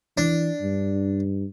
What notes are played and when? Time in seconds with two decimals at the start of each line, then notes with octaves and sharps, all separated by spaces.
0.18 E3 D4
0.61 G2